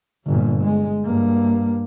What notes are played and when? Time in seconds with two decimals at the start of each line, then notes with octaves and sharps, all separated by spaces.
0.26 G1 A#2
0.63 G#3
1.05 G2 A#3